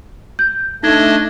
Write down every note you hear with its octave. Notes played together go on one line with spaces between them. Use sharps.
G6
A3 D4 D#4 D#5 G#6